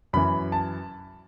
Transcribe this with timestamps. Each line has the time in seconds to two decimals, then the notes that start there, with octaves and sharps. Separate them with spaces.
0.13 F#2 E3 B5
0.52 A5